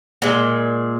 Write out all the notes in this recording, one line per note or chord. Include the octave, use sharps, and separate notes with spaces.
A#2 G#3